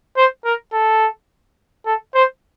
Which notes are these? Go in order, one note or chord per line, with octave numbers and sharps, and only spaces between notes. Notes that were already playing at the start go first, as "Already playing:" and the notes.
C5
A#4
A4
A4
C5